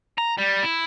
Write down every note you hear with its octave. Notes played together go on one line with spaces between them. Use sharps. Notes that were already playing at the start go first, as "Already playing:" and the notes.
A#5
G3
E4